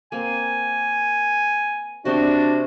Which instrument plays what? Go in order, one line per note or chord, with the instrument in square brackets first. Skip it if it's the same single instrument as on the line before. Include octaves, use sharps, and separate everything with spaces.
[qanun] A#3 C4 [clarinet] G#5
[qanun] C3 C4 [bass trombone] D4 [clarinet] F#4